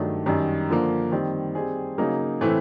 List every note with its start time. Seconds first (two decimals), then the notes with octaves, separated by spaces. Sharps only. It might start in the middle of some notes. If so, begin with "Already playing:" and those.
Already playing: G2 D#3 F#3 A3 D4
0.26 F#2 D#3 G3
0.69 D3 F3 A#3
1.12 D#3 G3 C4
1.55 G3 C4 D#4 G#4
1.98 C#3 F#3 A#3 D#4 G#4
2.41 A2 E3 A3 C4 E4